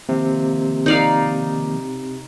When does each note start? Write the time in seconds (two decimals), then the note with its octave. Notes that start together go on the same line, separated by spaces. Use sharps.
0.09 C3 D#3 F3 A#3
0.86 D#4 D5 F5